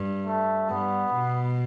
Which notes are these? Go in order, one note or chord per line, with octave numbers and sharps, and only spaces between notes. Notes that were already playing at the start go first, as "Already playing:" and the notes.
Already playing: G2
A3
G2 B3
B2